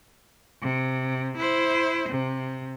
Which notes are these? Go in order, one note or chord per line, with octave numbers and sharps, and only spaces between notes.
C3
E4 C5
C3